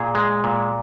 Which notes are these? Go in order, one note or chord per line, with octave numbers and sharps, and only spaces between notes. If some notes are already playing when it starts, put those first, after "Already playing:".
Already playing: A#2 G#4
G#3
A#2